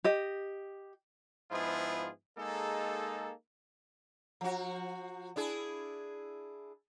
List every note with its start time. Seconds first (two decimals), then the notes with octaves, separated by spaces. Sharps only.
0.04 G4 D#5
1.52 G#2 F3 B3 E4 F4 G#4
2.38 G#3 A#3 D#4 G#4 A4
4.41 F3 F#4
5.36 D4 E4 G#4